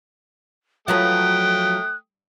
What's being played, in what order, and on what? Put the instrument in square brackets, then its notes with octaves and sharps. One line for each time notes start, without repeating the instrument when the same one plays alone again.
[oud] F3 F#3 B4 [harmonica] A3 G5 D#6 [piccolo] F#6